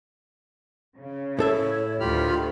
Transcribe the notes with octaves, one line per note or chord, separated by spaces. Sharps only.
C#3
A2 E4 A4 C#5 E5
D2 D#3 F4 G4 B5 F6